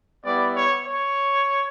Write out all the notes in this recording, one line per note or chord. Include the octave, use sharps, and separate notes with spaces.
G3 B3 E4 D5
C#5
C#5